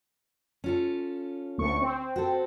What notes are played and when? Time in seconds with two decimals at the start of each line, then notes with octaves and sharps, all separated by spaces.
0.64 C#4 F4 A4
1.58 D2 C#6
1.82 C4
2.16 F#4 A4